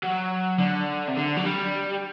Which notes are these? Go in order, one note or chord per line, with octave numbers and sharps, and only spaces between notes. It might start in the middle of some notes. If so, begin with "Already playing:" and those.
F#3
D3
C3
D3
F#3
G3